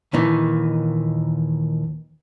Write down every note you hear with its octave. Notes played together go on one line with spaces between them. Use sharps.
D#2 A#2 D#3 E3 D#4